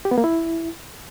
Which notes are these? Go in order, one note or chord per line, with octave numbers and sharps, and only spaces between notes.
G4
B3
A#3
E4